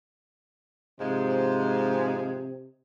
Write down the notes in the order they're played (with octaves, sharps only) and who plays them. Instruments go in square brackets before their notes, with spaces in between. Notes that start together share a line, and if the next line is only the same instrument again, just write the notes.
[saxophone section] G#2 F3 G#3 [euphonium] C3